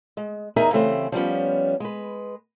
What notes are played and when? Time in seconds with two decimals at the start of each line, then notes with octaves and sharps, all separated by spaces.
0.17 G#3
0.56 E2 D#4 G#4 A#4 E5 G#5
0.73 C#3 E3 A3 C4 G4 C5
1.12 F3 G3 B3 C#4
1.80 G#3 B4